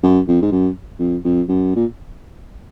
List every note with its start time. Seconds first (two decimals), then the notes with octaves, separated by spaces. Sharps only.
0.03 F#2
0.28 F2
0.42 G#2
0.51 F#2
0.99 F2
1.24 F2
1.48 F#2
1.76 A#2